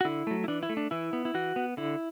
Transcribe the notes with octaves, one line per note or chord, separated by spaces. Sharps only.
F#4
D3 E4
F#3 A3
E4
E3 D4
E4
A3
D4
E3 E4
B3
E4
E3 F#4
B3
D3 E4